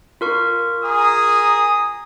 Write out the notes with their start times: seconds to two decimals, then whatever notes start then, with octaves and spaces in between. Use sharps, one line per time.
0.21 F4 A#4 C#6
0.83 G#4 A#5 D#6